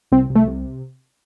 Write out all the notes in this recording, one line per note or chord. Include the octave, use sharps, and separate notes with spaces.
C2 C4
C2
A3
C3